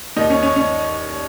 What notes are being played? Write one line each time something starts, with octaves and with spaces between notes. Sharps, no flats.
D#2 D#3 D#4
C#4
C#4
C#4